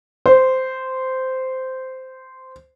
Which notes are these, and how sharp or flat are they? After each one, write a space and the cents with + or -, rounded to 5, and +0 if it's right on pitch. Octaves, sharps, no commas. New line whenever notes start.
C5 -10